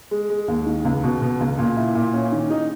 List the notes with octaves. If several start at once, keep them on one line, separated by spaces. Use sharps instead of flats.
G#3
G#3
D#2
D#3
C#2
B2
B2
C#2
A#2
E4
A#2
C#4
D#3
D#4